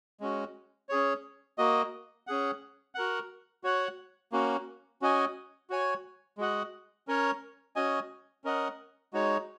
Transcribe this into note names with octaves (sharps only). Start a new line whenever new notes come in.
G#3 C#4 F#4
C#4 G#4 C#5
A#3 F#4 D#5
C#4 G#4 F#5
F#4 A#4 F#5
F#4 C#5 F#5
A#3 C#4 F#4
C#4 F#4 D#5 G#5
F#4 C#5 G#5
G#3 F#4 D#5 F#5
C#4 A#4 C#5
C#4 F#4 D#5 G#5
C#4 A#4 D#5 F#5
G#3 D#4 F#4 C#5